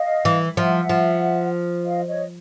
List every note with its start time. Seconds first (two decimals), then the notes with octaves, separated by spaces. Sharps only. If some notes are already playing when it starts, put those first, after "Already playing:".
Already playing: D#5 F5
0.25 E3
0.57 F3 E5 F#5
0.89 F3
1.86 D#5 F5
2.07 C#5 D#5